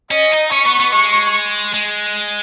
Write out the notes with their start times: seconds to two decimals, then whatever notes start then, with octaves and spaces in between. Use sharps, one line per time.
0.11 C#4 D#5
0.32 D#4
0.52 C#4 C#6
0.66 B3
0.80 B3
0.92 G#3 C#6
1.74 G#3